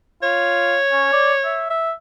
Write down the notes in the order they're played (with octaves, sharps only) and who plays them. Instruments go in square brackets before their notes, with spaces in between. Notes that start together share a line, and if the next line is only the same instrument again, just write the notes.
[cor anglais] F4 [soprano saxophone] C#5
[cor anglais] C#4
D5
E5
E5